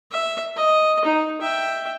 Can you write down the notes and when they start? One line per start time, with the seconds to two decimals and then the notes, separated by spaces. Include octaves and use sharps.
0.12 E5
0.57 D#5
1.05 D#4
1.41 E5 G5